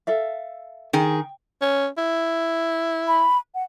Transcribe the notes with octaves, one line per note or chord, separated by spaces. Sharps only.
A4 E5 F5
D#3 G#4 G5
C#4
E4
B5
F#5